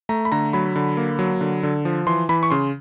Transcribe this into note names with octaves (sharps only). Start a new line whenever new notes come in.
A3 A#5
B5
D3 A#5
F#3 B5
D3
A#3
F#3
D3
D3
F3
E3 C6
E3 B5
C#6
C#3 C6